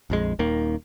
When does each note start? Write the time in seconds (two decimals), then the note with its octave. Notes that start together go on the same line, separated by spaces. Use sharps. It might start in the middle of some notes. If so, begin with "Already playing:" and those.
0.10 A#1 F2 G#3
0.39 D#1 D#2 D#3 A#3